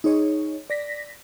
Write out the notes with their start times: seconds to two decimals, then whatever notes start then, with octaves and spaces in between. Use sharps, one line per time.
0.04 D#4 G#4 C#5 D#5
0.70 D5 A#6 B6